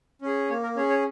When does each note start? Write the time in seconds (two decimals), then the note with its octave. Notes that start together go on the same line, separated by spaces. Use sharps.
0.22 C#4 G#4
0.49 A#3 C#5
0.63 A#4
0.76 C#4 G#4 C#5
0.90 C#5